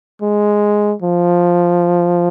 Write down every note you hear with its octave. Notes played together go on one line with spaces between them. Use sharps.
G#3
F3